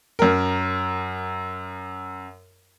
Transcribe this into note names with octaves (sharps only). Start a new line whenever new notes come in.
F#2 A#4